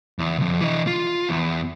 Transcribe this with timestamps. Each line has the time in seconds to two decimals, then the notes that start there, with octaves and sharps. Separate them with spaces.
0.19 E2
0.39 C2 F2
0.61 E3 D#5
0.87 F4
1.29 E2